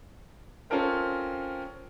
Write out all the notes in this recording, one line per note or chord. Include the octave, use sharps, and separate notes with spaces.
C4 C#4 F4 A4 A#4 C5